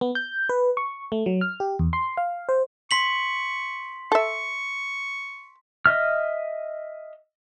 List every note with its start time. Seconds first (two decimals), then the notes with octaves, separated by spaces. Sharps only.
0.01 B3
0.15 G6
0.49 B4
0.77 C#6
1.12 A3
1.26 F#3
1.41 F6
1.60 G4
1.79 E2
1.93 C6
2.17 F5
2.49 C5
2.91 C6 C#6 B6 F#7
4.12 A4 E5 C#6
5.86 D#5 E5 F6